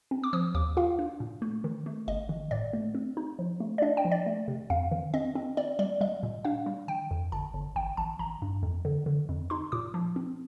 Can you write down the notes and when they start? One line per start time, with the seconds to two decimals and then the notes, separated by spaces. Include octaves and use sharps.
0.11 C4
0.24 D6
0.33 F3 D#6
0.54 D#2 D6
0.77 F4 F5
0.99 D4
1.20 A#2
1.42 A3
1.64 D#3
1.86 A3
2.07 G1 D#5
2.29 D#3
2.51 A2 D5
2.73 A3
2.95 C4
3.17 D#4
3.39 F3
3.60 A3
3.78 D5
3.82 D4 D#5
3.97 G5
4.05 F3
4.12 D5
4.26 A3
4.48 C3
4.70 F2 F5
4.91 D#3
5.14 C4 D#5
5.35 C4
5.57 C4 D5
5.79 G3 D5
6.01 G3 D#5
6.23 A#2
6.45 D4 F5
6.66 G3
6.88 D#3 G5
7.11 F2
7.32 G1 A5
7.54 G1
7.76 A1 G5
7.97 A1 A5
8.19 A1 A#5
8.42 G2
8.63 F2
8.85 D3
9.06 D3
9.29 F2
9.50 D#4 C6
9.72 A#2 D6
9.94 F3
10.16 C4